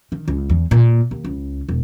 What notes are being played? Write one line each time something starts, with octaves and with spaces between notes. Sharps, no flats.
D#3
C#2
E2
A#2
D#2
C#2
E1